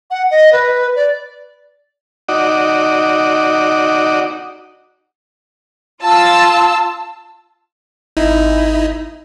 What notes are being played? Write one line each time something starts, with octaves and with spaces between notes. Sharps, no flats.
F#5
D#5
B4
D5
D#4 F#4 D5
F4 A5 E6
G#1 D#4 E4